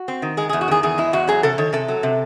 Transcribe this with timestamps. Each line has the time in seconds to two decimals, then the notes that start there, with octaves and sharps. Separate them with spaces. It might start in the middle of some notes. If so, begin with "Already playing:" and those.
Already playing: F#4
0.08 C4
0.22 D#3
0.37 G#3 G#4
0.49 E2 G#4
0.61 F#4
0.68 D#3 G#4
0.83 E2 G#4
0.98 G#3 E4
1.13 E2 F#4
1.28 F#3 G#4
1.43 C3 A4
1.58 D#3 C#5
1.73 C3 A4
1.88 F#3
2.03 C3